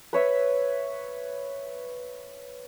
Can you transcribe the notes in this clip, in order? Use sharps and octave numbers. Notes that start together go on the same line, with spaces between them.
B4 C#5 E5